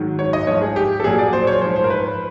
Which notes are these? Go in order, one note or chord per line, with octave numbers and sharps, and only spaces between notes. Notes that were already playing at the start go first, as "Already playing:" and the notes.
Already playing: G#2 D#3 F#3
C#5
D#5
G#2 F3 C#5
G#4
G4
A4
A#2 F#3 G#4
D5
C5
C#5
G#2 F3 C5
C5
A#4
B4